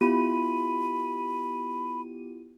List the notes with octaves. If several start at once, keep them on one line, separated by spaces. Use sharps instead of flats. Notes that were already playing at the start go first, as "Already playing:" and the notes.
B3 E4 F4 G4 B5 D#7